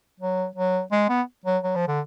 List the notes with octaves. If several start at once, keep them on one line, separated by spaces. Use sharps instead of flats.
F#3
F#3
G#3
B3
F#3
F#3
F3
D3